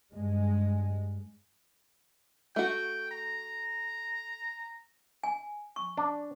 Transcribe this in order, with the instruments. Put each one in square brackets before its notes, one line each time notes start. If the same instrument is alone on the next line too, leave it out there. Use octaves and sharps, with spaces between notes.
[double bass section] G2 G#3
[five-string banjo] A3 F#4 [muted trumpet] G5
[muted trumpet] A#5
[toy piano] G#5
C#6
[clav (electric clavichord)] D4